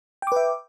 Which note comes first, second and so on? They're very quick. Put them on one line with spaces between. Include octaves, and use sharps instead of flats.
G5 D6 B4 E5